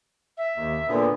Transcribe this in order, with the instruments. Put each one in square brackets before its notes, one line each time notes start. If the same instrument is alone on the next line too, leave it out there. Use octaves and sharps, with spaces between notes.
[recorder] E5
[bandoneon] D#2
A#2 D3 B3